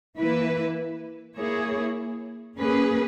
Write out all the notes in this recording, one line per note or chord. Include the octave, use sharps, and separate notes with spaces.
E3 A#3 E4 B4
A#3 E4 G#4 C#5
A#3 C#4 G#4 B4